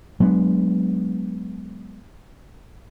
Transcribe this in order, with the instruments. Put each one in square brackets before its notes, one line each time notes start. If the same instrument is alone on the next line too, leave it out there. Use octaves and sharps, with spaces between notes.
[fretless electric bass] F#3 G#3 B3 D4